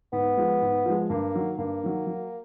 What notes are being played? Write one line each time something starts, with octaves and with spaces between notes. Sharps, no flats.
G#2 B3
F3 G#3
G#2
F3 G#3
G2 A#3
D#3 F#3
G2 A#3
D#3 F#3
F#3